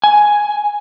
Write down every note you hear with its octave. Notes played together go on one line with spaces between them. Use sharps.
G#5